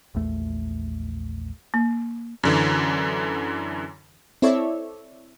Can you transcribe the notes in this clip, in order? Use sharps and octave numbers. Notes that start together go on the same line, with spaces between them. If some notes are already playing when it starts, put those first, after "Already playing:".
A#1 E2 A3
A#3
F#2 D3 E3
C4 E4 A4 C#5 D5 E5